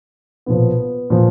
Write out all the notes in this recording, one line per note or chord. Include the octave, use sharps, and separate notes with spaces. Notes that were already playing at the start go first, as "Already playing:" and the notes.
B1 A#2 F3 B3
A#2 F3